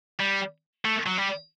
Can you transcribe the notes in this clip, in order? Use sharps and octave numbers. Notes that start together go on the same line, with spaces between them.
G3
A3
F#3
G3